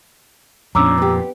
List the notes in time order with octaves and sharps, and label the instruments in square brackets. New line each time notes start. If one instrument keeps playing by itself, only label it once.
[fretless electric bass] F2 A#2 [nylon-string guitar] C#4 D4 [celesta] A#5 D6 E6
[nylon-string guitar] B3 G4